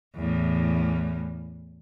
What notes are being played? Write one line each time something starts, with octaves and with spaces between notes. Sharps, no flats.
E2 A2